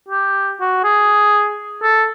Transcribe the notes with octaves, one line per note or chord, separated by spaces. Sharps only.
G4
F#4
G#4
A4